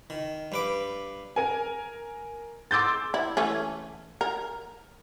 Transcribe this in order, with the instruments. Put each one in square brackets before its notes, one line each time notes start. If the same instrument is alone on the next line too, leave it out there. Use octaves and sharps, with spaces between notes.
[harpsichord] D#3
G2 B4 D6
[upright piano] A#4 G#5
C6 D6 E6 G6 A6
[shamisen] E4
E3 A3 C#4
A#4